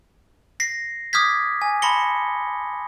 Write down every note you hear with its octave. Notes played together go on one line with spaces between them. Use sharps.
A#6 C7
D6 D#6 F6 G6 G#6 B6
G#5
A5 B5 C6 A#6 C#7 G7